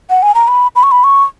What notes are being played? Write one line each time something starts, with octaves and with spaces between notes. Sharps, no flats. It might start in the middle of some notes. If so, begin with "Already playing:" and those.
F#5
G#5
A#5
B5
B5
C#6
B5
C#6